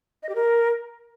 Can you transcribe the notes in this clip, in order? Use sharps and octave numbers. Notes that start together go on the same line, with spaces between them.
D#5
G4
A#4